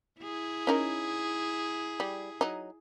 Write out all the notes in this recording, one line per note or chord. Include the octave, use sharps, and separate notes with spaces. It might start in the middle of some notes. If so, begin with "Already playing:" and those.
E4 G#4
C#4 D#4 A#4
G3
F#3 D#4